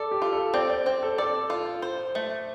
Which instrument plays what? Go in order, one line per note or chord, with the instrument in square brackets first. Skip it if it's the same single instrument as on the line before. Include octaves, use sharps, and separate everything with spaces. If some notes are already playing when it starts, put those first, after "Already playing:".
Already playing: [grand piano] A4 [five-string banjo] D5
[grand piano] G4
[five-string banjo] F4
[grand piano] A4
[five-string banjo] C4 [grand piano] D5
[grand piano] D5
[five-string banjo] C4 [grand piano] C5
[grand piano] A4
[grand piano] A4 [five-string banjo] D5
[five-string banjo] F4
C5
A3